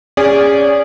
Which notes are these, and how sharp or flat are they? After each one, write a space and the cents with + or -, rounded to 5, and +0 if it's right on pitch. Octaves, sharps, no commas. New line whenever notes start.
C#4 +0 G#4 -20 D5 -20